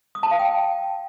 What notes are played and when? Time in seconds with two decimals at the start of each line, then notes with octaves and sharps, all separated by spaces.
0.15 D#6
0.23 A5
0.31 F5
0.39 G5